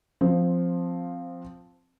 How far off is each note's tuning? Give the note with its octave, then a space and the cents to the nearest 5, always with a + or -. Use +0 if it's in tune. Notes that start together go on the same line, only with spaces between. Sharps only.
F3 +5 C4 +0